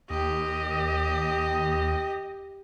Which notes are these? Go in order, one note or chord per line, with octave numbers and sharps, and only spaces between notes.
D#2 G4 D#5